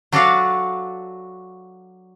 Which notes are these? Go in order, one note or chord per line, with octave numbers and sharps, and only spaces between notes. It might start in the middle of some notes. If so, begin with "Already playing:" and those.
F#3 D4 F#4 A4 D5 F5